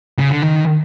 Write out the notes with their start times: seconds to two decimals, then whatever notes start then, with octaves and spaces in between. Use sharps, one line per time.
0.19 C#3
0.31 D3
0.42 D#3